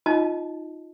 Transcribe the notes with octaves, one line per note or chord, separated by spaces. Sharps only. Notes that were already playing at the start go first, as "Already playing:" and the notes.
D#4 F4 D#5 A5